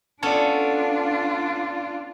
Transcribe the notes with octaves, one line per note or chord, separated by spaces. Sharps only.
B3 C#4 D4 F4 A4 D5 A5